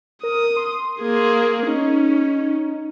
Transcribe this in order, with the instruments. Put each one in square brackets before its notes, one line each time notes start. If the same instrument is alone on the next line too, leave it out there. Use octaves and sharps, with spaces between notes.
[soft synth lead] A#4 [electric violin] D#6
[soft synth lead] C6
[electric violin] A#3 G#4
[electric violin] C#4 [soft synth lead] D#4